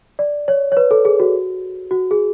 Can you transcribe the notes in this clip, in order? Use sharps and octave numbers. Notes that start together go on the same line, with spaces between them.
D5
C#5
C#5
B4
A4
G#4
F#4
F#4
G#4